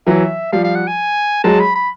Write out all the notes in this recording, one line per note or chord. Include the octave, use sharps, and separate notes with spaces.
E3 F#3 E5
F3 G3 F5
F5
F#5
G#5
F#3 G#3 A5
B5
B5